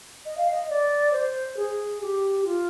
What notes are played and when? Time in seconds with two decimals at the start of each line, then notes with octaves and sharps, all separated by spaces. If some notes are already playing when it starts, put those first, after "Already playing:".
0.25 D#5
0.37 F5
0.51 D#5
0.69 D5
1.12 C5
1.56 G#4
2.01 G4
2.44 F4